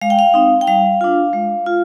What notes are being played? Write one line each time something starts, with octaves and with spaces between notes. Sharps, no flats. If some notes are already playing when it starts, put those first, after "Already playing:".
G#3 F5
G5
F5
C4 D#4
G5
G3 F5
D4 F4
G#3
F4